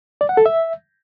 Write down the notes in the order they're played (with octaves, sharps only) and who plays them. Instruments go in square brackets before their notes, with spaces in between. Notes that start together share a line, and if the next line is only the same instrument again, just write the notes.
[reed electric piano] D5
F#5
A4
E5